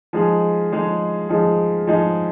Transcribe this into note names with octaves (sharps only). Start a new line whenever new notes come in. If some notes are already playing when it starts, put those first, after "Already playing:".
F3 G#3 D#4 G#4
F3 G#3 D#4 G#4
F3 G#3 D#4 G#4
F3 G#3 D#4 G#4